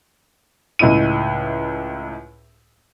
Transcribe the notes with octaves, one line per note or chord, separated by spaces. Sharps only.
C#2 A2 D#4 E4 D#7